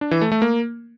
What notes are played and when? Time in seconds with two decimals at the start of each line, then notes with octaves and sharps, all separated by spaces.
0.01 D4
0.11 E3
0.21 A3
0.32 A3
0.42 A#3